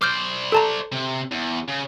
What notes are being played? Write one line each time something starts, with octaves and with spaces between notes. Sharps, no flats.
C5 D5 D6 F6 G6
A4 A5 A#5
C3
E2
C#3